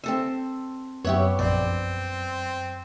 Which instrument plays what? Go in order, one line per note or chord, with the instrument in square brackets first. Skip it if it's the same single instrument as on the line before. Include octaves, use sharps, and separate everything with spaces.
[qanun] C4 A4 E5
[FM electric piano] F#2 [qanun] B3 G4 [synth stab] C#5 E5
[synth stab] A#1 F2 [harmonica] C4 [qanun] D5